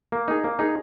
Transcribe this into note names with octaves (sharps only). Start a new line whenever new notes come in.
A#3
D#4 G#4
A#3
D#4 G#4